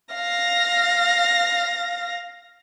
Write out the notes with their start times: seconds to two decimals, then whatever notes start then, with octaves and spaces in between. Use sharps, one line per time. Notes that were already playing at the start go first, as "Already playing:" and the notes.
0.14 F5 A#6